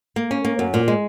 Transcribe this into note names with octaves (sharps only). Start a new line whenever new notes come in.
A#3
C#4
A#3
F#2
A#2
G#3